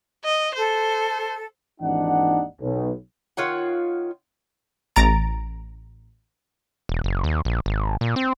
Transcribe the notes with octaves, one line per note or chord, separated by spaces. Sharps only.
D#5
A4 C5
G#1 D#2 E3 D4 D#4 F#5
B1
D#3 F4 C#5 F#5
A1 A#5 A6 D7
E1
F#1
D#2
A#1
G#1
A#2
C4